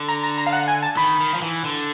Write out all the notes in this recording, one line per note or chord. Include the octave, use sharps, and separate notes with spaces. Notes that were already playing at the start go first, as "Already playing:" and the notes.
Already playing: D3
A#5
A#5
A#5
F5
F#5
G#5
A5
D#3 B5
D#3
F3
E3
D3